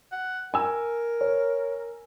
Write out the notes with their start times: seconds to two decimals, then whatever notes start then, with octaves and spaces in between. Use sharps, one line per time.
0.12 F#5
0.54 A#4 G#5 E6
1.21 C#5